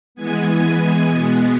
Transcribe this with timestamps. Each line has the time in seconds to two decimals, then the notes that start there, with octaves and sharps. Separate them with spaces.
0.15 E3 G#3 B3 G#5
1.08 B2 G#3 B3